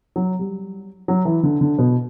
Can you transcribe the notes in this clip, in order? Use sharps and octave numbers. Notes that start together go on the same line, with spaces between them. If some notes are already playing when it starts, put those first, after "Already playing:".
F#3
G3
F#3
E3
D3
D3
B2